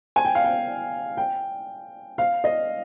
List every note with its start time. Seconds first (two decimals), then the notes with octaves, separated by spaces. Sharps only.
0.16 G#5
0.25 G5
0.35 F5
0.45 G5
1.17 G5
2.18 F5
2.44 D#5